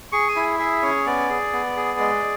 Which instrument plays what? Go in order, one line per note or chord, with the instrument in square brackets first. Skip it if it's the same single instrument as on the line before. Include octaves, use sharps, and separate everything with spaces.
[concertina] G#4 C#6
G#5
E4
G#4 E5
C#4 C#5
B3 D5
G#4
B3
G#4
G#3